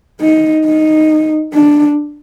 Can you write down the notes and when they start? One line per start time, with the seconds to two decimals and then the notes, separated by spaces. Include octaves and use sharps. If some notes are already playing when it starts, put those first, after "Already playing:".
0.21 D#4
0.65 D#4
1.54 D4